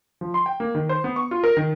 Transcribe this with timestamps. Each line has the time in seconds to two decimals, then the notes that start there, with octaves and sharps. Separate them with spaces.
0.21 F3
0.34 C6
0.46 G5
0.60 A#3
0.75 D#3
0.89 C5
1.04 B3
1.16 C#6
1.31 F4
1.44 A#4
1.57 D#3